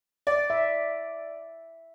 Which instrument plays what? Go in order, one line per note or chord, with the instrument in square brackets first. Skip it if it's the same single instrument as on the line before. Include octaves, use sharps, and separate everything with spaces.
[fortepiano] D5
[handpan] E5